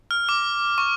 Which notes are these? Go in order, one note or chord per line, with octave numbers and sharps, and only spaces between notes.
F6
D6
C#6